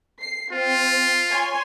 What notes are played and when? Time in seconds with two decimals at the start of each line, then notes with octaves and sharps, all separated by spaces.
0.21 C7
0.52 C4 F4
1.31 C#5 G#5 C6